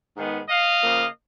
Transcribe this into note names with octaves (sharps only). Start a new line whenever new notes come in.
G#2 D#3 G#3 B3
D#5 F5
C#3 F3 A#3